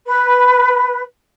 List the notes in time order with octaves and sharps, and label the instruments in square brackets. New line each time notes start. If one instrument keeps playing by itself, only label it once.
[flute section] B4